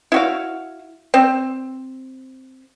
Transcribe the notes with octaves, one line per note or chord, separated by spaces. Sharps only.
E4 F#4 F5
C4